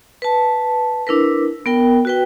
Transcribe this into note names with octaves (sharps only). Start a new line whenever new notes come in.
B4 A5
D4 E4 A#4 B4
B3 A#4 G5
F#4 B4 G5